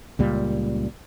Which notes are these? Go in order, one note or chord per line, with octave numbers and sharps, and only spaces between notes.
C#2 A#2 G3